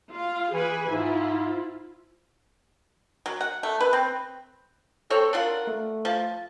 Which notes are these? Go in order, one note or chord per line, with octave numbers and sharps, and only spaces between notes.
F4 F5
E3 G#4 B4 G#5
G#2 E4 F4
F#3
F#5
A3
B4
C4
C4 A4 C#5
D4 F4 A#4 F#5
A3
F3 A5